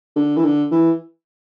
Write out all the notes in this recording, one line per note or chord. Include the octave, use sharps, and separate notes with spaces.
D3
E3
D3
E3